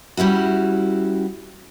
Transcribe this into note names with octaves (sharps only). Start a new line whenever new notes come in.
G3 C#4 E4 F#4